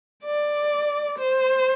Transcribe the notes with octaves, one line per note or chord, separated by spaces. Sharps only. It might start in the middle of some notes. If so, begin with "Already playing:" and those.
D5
C5